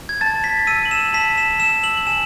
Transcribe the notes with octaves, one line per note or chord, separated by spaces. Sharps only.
G#6
A5 A6
B6
E6 D#7
F#7
E7
A5 B6
E7
E6 E7
F#7
F#7
G#5 E7